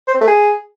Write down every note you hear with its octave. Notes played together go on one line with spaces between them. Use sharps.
C5
C4
A3
G#4